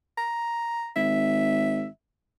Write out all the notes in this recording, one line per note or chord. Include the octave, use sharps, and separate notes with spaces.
A#5
G#1 E5